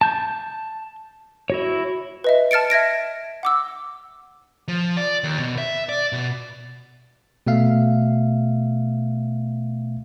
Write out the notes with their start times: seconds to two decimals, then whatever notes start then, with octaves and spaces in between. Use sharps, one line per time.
0.01 A5 G6
1.50 E4 F#4 C#5
2.24 B4 D#5 E5
2.51 A5 F6 A6 C#7 D7
2.70 E5 G#6 A#6 D7
3.43 F#5 D6 E6
4.68 F3
4.97 D5
5.24 D#2
5.39 B2
5.58 E5
5.89 D5
6.12 B2
7.47 B2 A3 E5 F5